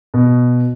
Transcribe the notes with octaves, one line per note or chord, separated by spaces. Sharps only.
B2